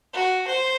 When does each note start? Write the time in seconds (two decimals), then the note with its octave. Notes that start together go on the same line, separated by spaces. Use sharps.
0.13 F#4
0.48 C5